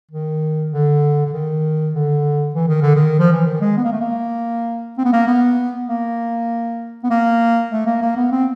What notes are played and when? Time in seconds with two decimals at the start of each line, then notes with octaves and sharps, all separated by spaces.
0.11 D#3
0.73 D3
1.26 D3
1.34 D#3
1.95 D3
2.55 E3
2.68 D#3
2.82 D3
2.95 D#3
3.19 F3
3.32 E3
3.46 D#3
3.61 G#3
3.77 B3
3.84 A#3
3.93 A3
4.01 A#3
4.98 C4
5.05 B3
5.13 A#3
5.28 B3
5.88 A#3
7.03 B3
7.10 A#3
7.72 A3
7.86 A#3
8.02 A#3
8.17 B3
8.31 C4